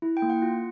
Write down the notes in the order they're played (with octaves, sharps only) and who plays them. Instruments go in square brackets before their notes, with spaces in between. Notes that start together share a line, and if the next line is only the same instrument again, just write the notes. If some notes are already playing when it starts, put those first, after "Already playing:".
[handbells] E4
G5
A#3
F#5
F4